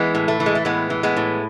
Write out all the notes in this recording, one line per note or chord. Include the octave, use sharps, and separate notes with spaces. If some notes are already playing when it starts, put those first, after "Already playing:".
Already playing: E3 G#3 B3
A2
A3
E3
G#3
A3
A2 G#3 B3
E3
G#3 B3
A2